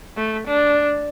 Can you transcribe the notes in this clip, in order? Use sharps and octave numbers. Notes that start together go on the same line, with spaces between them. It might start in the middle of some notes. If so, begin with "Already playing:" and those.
A3
D4